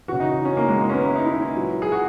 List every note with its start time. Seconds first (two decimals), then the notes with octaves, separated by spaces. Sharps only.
0.08 E3 F#4
0.13 C#3
0.20 D#4
0.45 C#4
0.57 A#3
0.69 G#3
0.82 A#3
0.89 C#4
0.93 B3
1.06 E4
1.16 D#4
1.25 E4
1.55 A#2 F#3
1.82 G#4
1.92 F#4